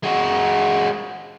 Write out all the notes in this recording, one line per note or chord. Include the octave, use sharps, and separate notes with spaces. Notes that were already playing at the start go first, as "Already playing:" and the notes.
G#3 F#4